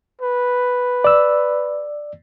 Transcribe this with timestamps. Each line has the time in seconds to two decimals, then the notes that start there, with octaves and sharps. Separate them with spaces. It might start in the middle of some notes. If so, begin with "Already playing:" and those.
0.21 B4
1.04 D5 E6